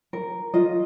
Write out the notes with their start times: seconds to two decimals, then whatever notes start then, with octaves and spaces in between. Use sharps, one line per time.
0.13 A#4
0.54 F4 D#5